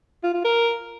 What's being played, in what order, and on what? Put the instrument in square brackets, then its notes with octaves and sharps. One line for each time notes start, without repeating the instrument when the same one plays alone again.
[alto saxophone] F4
F4
A#4